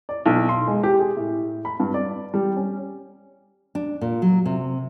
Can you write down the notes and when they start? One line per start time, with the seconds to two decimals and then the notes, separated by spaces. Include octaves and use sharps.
0.09 D5
0.26 B1
0.49 C6
0.67 G#3
0.83 G4
1.00 G#4
1.17 A2
1.65 B5
1.80 G2
1.94 D5
2.34 G3
2.56 C#4
3.75 D4
4.01 A#2
4.22 F#3
4.45 C3